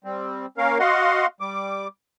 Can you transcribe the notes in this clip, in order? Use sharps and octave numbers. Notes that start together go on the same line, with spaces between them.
G3 C4
A#3 C#4 A#4 F5
F#4 D#5 F5 F#5 C6
G3 D6